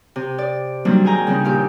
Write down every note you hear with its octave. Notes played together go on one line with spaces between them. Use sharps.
C3
D5
D#3 F#3 G3 A#3 C4 D4
G#4 G5 G#5 A#5 G6
C#3 F3 C4 D#4
D#2 A#2 G4 F5